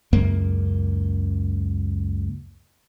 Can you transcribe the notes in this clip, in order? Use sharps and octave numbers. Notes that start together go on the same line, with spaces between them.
C#2 F#2 A#3